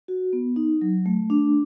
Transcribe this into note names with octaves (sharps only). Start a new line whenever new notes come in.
F#4
B3
D#4
F#3
A3
D4